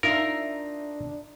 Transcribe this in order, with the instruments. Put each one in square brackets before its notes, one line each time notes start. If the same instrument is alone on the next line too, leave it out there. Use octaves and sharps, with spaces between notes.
[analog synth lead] D4 [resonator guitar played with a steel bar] D#4 F4 E5 [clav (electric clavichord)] A#4